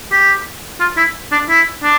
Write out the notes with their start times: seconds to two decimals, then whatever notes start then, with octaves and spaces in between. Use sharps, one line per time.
0.12 G4
0.80 F4
0.97 E4
1.32 D4
1.49 E4
1.83 D4